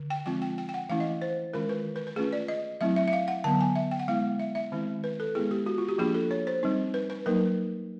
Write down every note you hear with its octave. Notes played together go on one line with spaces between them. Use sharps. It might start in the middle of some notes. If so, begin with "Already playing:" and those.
Already playing: D3
G5
F3 G#3 C4 F4 G5
G5
G5
G5
F#5
E3 A3 C#4 E4 F5
D#5
C5
D#3 G#3 C#4 F4 A#4
B4
B4
B4
A3 C#4 F4 G#4
D5
D#5
F#3 A3 C4 E4 E5
E5
E5
F5
F#5
D3 F#3 B3 A5
G#5
E5
G5
F#5
G#3 B3 E4 F5
E5
E5
D#3 G#3 C4 E4
B4
A4
G#3 B3 E4 G#4
G4
F#4
F4
G4
F3 A#3 D4 F4 G#4
A4
C#5
C5
G3 C4 D#4
B4
B4
F#3 A#3 D#4 A#4